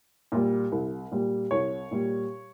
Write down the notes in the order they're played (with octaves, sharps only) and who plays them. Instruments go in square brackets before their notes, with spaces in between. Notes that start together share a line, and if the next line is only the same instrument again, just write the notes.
[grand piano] A#2 G3
C2
A#2 G3
C2 C#5
A#2 G3